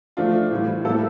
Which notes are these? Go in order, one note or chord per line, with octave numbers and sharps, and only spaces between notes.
F3 A3 D4 F4
A2 E3 G3 C4
A2 G3 A#3 E4 A4